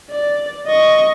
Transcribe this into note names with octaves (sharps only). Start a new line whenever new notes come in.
D5
D#5 C#6